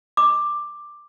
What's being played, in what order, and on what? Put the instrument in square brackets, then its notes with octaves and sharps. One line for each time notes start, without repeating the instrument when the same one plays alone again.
[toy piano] D6